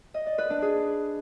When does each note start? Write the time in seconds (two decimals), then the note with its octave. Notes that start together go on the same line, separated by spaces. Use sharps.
0.14 D#5
0.26 D5
0.38 B4
0.50 D4
0.62 G#4